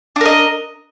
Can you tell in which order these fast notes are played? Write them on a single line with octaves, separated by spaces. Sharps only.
D4 A#4 D#5